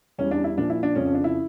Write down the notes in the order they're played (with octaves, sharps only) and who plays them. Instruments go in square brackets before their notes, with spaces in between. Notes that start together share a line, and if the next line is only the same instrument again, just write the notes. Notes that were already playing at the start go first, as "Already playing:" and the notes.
[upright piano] E2 E3 G3 C#4
D4
E4
A#2 F3 D4
E4
D4
F2 C#3 F3 C#4
C#4
D4
E4